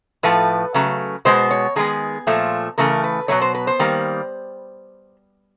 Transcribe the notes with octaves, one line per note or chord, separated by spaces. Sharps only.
A2 F3 A3 B4
C#3 F#3 A3
B2 G#3 B3 C5
C#5
D#3 G#3 B3 G#4
A#2 F3 A3
C#3 E3 A3 A#4
B4
B2 F#3 A3 C#5
C5
B4
C5
D#3 G3 A#3